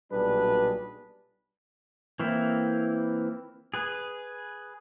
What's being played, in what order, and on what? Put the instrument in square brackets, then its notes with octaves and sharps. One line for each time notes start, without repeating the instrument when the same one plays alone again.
[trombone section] B1 A#2 G3 D4 G#4 B4
[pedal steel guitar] E3 A#3 C4 E4
G#4 B4